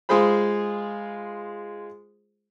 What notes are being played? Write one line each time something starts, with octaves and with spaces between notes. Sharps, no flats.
G#3 F4 G#4 C5 B5